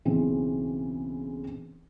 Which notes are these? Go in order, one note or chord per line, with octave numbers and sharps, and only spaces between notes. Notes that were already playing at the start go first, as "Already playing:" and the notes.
B1 C#3 E3 C4